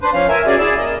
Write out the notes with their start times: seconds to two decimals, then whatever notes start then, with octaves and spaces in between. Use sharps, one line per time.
0.01 D4 B4 C5
0.13 F3 C#4 F5
0.29 A#4 E5 G#5
0.46 C#4 F#4 G#4 D5
0.59 E4 G#4 D5 E6
0.77 A#3 D#5